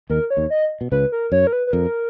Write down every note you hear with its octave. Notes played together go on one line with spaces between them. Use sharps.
D#2 D#3 A#4
C#5
D#2 D#3
D#5
B2
C#2 C#3 B4
A#4
F#2 C#5
A#4
B4
B4
F2 A#4